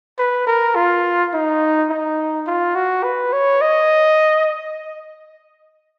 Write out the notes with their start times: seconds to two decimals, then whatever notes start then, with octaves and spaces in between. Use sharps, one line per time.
0.19 B4
0.47 A#4
0.76 F4
1.34 D#4
1.90 D#4
2.47 F4
2.75 F#4
3.04 B4
3.33 C#5
3.62 D#5